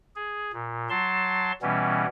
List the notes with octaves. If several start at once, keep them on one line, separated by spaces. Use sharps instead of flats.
G#4
A#2
F#3 A5 C6
B2 E3 G3 B3 C#4